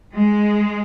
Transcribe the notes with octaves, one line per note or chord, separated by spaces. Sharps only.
G#3